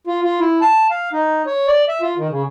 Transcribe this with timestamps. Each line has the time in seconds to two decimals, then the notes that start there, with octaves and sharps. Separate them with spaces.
0.07 F4
0.23 F4
0.40 E4
0.61 A5
0.90 F5
1.13 D#4
1.46 C#5
1.68 D5
1.89 E5
2.01 F4
2.17 D#3
2.30 C#3